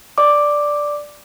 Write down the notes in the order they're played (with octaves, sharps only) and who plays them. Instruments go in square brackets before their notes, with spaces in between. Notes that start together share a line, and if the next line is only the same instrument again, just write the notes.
[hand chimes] D5 D6